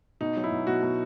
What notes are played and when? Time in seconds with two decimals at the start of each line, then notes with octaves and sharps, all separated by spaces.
0.21 B2 D#4
0.36 F#3 D#4
0.44 E4
0.51 B2
0.67 B2 F#4
0.82 B2